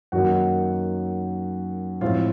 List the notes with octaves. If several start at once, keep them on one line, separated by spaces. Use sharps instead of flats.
F#2 D#3 F#3 A#3 D#4 F#4 F#5
A2 F3 G#3 C4 F4 F5